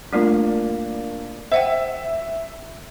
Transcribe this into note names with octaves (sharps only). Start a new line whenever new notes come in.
G3 A3 A#3 D4 F4
C5 E5 F#5 G5